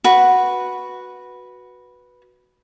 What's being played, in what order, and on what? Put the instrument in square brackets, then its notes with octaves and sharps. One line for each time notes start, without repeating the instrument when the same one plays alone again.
[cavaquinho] F#4 B4